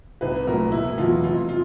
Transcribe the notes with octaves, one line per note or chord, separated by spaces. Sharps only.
C2 B4
A#2 F#3 A3 A#4
E1 E4
E2 B2 F#3 F4
F1 F4
F4